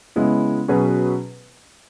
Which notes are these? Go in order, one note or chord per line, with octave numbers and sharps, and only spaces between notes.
C#3 G#3 B3 E4
B2 F#3 C#4 G#4 B4